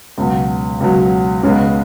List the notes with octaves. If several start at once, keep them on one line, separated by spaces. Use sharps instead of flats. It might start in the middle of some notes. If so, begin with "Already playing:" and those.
C#2 B2 F#3
C#2 B2 F#3
C#2 C#3 G#3 B3